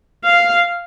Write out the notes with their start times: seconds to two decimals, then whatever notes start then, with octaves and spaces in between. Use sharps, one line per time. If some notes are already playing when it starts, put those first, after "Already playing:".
0.24 F5